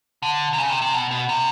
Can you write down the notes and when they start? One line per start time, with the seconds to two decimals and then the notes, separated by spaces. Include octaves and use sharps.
0.22 D3
0.53 C3
0.58 C#3
0.69 C3
0.82 C3
0.93 B2
1.11 B2
1.29 C3